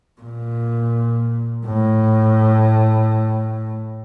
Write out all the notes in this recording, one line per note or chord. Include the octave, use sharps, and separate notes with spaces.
A#2
A2